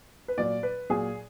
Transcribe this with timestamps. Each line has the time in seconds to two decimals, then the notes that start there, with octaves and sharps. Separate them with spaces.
0.28 B4
0.38 A#2 F#3 D5
0.63 B4
0.90 A#2 F#3 G#4